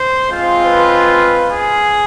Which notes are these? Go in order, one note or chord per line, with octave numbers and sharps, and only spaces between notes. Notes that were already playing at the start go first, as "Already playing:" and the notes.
Already playing: C5
G#3 C4 F4
B4
G#4